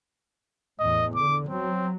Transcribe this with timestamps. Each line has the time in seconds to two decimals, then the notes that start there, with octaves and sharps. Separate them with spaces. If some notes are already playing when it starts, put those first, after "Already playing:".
0.79 E2 A2 D#5
1.16 D3 D6
1.49 F#3 C4